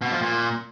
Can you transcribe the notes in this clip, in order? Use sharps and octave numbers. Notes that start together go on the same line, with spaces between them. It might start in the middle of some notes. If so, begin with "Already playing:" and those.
B2
F3
A#2